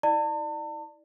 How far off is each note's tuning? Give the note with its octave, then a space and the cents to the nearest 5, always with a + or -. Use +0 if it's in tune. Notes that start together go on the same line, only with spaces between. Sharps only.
E4 -35 D5 +20 A5 +40